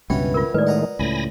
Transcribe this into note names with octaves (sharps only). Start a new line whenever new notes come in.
C#2 G2 B2 E3 B3 C#4 G5
F4 A#4
A2 D#3 G#3 B4 D5
F#5 A#5 D#6
C#2 A2 G#5 B5 A#6